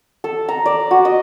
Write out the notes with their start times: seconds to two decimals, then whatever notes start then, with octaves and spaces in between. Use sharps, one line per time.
0.24 A4
0.49 A#5
0.66 D5
0.91 F#4
1.05 D#5